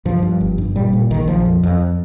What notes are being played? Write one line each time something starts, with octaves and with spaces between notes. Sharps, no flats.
G2 F3
G2
G1
G2
A#2 G3
A#2
A#1 D#3
A#1 F3
F2
F2